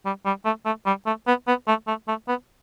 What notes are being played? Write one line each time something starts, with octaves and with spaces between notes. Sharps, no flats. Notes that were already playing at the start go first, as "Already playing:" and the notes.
G3
G3
A3
A3
G3
A3
B3
B3
A3
A3
A3
B3